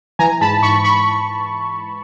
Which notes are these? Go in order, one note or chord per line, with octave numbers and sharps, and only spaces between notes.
E3 G#5 A#5
G#2 A5 B5
G#2 B5 C#6
B5 C#6